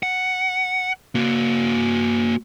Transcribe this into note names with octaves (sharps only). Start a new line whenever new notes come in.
F#5
A#3 F#4